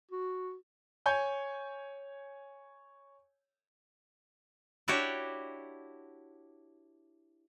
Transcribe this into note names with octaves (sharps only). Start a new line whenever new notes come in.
F#4
C#5 G#5 G6
D4 E4 F#4 G4 C#5